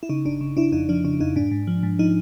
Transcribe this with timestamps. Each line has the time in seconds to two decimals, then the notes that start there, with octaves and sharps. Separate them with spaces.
0.03 E4
0.09 C#3 D#4
0.25 G1 D4
0.41 C#3
0.57 C#3 D4 E4
0.72 F2 D#4
0.89 F3 D4
1.04 C#3 D4
1.20 F2 D#4
1.36 G#2 D4
1.51 G#2
1.67 F3
1.83 G#2
1.99 F3 D#4